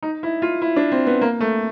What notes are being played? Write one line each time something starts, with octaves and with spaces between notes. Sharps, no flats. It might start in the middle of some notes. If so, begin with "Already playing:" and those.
D#4
E4
F4
E4
D4
C4
B3
A#3
A3